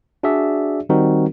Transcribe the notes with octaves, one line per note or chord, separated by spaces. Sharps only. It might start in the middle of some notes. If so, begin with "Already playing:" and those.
D4 F#4 G#4 D5 E5
D#3 G3 C4 D#4 F#4 A#4